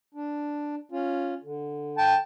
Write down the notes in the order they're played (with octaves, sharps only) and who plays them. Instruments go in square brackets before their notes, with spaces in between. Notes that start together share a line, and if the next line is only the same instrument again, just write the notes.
[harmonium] D4
C#4 F4
D3
[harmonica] G5 A5